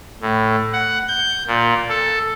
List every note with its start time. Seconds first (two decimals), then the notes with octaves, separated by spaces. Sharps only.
0.21 A2
0.73 F#5
1.08 G6
1.47 A#2
1.89 A4